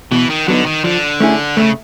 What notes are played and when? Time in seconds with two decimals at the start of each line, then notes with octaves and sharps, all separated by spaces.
0.12 B2 E3
0.30 D#3
0.48 D3 F#3 B3 D#4
0.66 D#3
0.84 D3 F3
1.20 A3 C#4 E4 G#4
1.56 C#3 A3